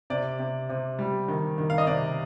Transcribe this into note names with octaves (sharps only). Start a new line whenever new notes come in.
C3 D5
C3
C3
G3
D#3
D#3
F5
D#5
C3 D5